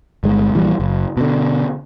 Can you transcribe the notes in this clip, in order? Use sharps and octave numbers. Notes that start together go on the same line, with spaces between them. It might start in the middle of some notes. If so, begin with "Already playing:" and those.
G1 G#3
A#1 E3 G3
F#1
B2 D3